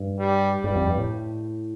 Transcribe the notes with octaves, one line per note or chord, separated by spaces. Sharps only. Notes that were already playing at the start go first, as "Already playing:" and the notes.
Already playing: G2
G3
G2 G3
F2
G2
A2